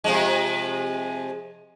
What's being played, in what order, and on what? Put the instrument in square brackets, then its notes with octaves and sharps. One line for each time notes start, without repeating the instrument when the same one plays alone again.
[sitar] C3 F3 G#3